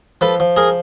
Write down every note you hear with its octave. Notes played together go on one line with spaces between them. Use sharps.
F3 A4 B4
F3
G#4 A#4